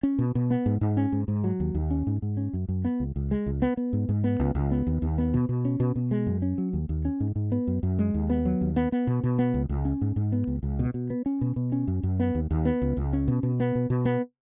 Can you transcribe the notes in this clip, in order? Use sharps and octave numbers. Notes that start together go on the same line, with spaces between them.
C#4
B2
B2
B3
G#2
G#2
C#4
G#2
G#2
F#3
D#2
D#2
C#4
G#2
G#2
C#4
F#2
F#2
B3
C#2
C#2
G#3
C#2
B3
B3
G#2
G#2
B3
C#2
C#2
B3
D#2
D#2
B3
B2
B2
C#4
B2
B2
G#3
F#2
C#4
F#3
D#2
D#2
C#4
G#2
G#2
B3
F#2
F#2
G#3
D#2
B3
F#3
D#2
B3
B3
B2
B2
B3
C#2
C#2
C#4
G#2
G#2
B3
C#2
C#2
B2
B2
B3
C#4
B2
B2
C#4
F#2
F#2
B3
D#2
D#2
B3
C#2
C#2
C#4
B2
B2
B3
B2
B2
B3